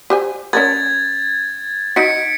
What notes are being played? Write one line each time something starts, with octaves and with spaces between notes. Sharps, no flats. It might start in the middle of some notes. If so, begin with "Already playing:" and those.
G4 C5 G#5
C#4 A#4 B4 G#6 A6
D#4 F#4 B6 C#7 D7